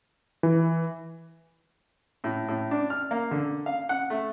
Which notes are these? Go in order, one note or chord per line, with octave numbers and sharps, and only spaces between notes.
E3
A2
A2
D4
F6
A#3
D3
F5
F#5
A3